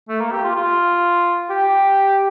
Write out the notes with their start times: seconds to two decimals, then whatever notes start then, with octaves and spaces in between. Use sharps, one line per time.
0.09 A3
0.20 A#3
0.32 G4
0.44 F4
0.56 F4
1.50 G4